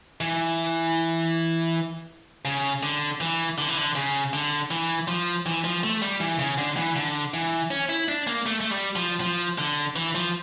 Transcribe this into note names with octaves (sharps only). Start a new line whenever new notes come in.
E3
C#3
D3
E3
D3
E3
D3
C#3
D3
E3
F3
E3
F3
A3
G3
E3
C#3
D3
E3
D3
E3
C#4
E4
D4
A#3
A3
A3
G3
F3
F3
D3
E3
F3